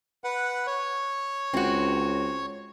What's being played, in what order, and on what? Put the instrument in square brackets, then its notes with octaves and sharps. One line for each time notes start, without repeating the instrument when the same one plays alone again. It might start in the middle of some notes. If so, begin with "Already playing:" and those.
[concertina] B4 F#5
C#5
[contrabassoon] C#2 [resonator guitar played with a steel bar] C4 F#4